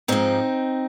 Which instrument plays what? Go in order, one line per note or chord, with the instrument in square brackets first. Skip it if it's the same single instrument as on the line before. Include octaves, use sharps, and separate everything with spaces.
[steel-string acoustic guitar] G#2 F3 C4 D#4